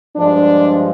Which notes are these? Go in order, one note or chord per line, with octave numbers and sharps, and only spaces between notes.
G2 F3 G#3 D4